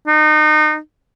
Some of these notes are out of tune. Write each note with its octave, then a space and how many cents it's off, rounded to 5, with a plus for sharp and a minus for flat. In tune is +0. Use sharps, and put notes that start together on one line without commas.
D#4 -30